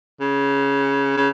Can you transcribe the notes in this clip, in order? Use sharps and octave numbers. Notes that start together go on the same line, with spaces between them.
C#3
C#3